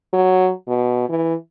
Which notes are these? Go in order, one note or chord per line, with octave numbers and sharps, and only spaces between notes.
F#3
B2
E3